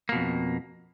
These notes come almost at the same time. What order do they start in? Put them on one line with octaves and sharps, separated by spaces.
A#3 B2 F2